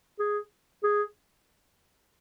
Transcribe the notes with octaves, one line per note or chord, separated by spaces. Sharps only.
G#4
G#4